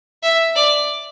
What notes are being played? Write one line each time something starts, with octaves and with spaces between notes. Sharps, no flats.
E5
D5